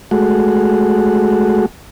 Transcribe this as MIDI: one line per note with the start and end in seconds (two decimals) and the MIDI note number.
0.11 1.66 56
0.11 1.66 57
0.11 1.66 66